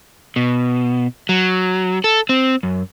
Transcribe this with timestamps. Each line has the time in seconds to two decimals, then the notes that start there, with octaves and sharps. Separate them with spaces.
0.36 B2
1.29 F#3
2.04 A4
2.29 C4
2.63 F#2